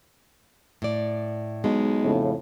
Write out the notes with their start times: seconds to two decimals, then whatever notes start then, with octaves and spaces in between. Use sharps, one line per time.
0.82 A2 D5
1.64 B1 G#3
2.02 F2 A2 C#3